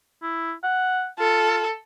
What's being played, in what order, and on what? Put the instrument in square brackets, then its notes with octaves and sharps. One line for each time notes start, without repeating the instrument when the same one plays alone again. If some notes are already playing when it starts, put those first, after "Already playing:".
[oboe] E4
F#5
[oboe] F4 [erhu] A4